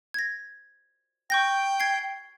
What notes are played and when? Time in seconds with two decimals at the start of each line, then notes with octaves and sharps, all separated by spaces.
0.14 G#6 A#6
1.30 G5 C#6 G6 A#6
1.80 G#6 C7